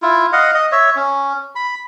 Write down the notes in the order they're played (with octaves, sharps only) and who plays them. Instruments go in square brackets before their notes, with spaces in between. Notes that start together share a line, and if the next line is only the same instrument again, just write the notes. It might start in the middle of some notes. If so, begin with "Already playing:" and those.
[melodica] E4 F4
D#5 F5 F#5
D#5
C#5 E5
C#4
B5